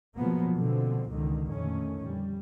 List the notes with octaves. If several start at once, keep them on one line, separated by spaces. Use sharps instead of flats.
B2 F3 F#3 G#3 A#3 B3
B2 D3 F3 C4
C#2 B2 D3 D#3
F2 A#2 D3 D#3 A3 C#4
F2 G3